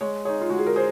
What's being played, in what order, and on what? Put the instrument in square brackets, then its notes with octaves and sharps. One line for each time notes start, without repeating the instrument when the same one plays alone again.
[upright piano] G#3 [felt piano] C#5
[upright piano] D#4 G#4 [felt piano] C#5
[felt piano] F4
[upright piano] G#3 [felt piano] F#4
[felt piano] G#4
A#4
[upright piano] G#4 [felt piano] C5